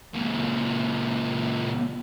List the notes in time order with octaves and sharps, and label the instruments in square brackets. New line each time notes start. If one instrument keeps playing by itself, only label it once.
[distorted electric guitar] C#2 A#2